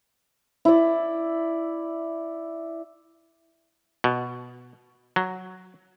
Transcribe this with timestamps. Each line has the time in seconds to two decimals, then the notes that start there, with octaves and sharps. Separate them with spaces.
0.65 E4 D5
4.04 B2
5.16 F#3